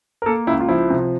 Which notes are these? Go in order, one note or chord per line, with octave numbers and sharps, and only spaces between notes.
A#4
A#3 A4
C#2 E4
F4
F3 E4
C3